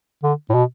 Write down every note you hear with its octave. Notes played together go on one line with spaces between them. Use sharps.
D3
A2
B2